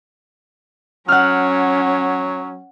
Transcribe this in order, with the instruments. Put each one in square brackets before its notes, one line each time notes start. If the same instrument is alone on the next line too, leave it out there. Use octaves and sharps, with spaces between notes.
[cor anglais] F#3 [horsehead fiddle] C#4 [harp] F#5 F6